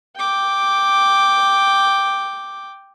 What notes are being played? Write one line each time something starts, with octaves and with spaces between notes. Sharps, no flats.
G5 D6